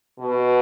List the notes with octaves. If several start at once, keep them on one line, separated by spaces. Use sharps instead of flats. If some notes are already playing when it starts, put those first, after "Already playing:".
B2